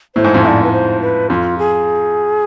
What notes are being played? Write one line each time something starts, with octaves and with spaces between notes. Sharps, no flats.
A2 C5
G#2
F2
G#2 D5 E5
B4
C5
B4
F2 F4
G#4